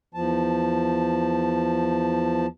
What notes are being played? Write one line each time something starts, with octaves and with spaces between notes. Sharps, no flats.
E2 F3 A5